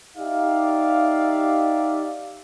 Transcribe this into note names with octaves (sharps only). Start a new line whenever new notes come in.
D#4 G4 D5 E5 F5